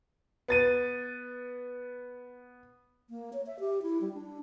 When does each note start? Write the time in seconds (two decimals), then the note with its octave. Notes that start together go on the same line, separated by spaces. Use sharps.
0.48 B3 A6 D#7
3.10 A#3
3.33 C#5
3.46 E5
3.60 G4
3.82 E4
4.01 G3
4.14 D4